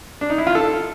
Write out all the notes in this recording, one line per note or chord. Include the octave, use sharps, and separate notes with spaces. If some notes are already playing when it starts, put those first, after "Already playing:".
D4
D#4
E4
F4
A4